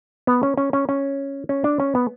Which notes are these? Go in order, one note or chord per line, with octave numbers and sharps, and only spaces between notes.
B3
C#4
C#4
C#4
C#4
C#4
D4
C#4
B3